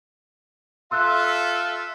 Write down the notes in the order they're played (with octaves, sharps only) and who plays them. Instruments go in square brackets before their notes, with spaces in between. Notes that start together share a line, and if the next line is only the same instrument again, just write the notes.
[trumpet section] F4 A4 E5 [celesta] C6 E6 F#6